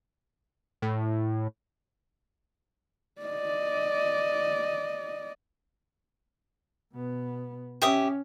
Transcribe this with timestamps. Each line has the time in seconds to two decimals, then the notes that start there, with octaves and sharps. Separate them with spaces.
0.82 A2
3.21 D5 D#5
6.92 B2 B3
7.82 C#4 G4 E5 D#6